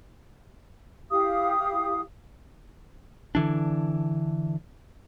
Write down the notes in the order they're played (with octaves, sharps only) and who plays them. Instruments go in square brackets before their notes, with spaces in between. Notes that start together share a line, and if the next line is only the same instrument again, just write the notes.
[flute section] E4 G4 F5 D#6
[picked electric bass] D3 E3 D4